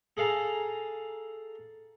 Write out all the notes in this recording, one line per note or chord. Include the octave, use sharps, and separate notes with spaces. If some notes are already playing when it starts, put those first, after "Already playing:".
G#4 A4 F5 G#5 A#5